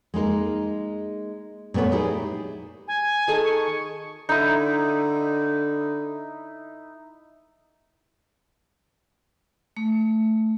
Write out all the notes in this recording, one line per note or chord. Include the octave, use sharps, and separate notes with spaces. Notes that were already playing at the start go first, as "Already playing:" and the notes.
G#3 A#3 D#4 A#4
A#2 A3 B3 B4 C#5
D#4 E4 G4 G#4
G#5
D#3 G#4 A4
C#6
D3 D#4 E4
A3